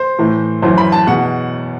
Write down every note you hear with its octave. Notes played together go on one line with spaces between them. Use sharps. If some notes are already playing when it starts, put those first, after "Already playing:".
Already playing: C5
A2 E3
F#2 E3 C5
B5
A5
E2 B2 F#5